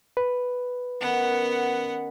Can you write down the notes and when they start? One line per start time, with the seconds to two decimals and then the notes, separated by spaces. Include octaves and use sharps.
0.17 B4
1.00 D#3 B3 C#4 F#5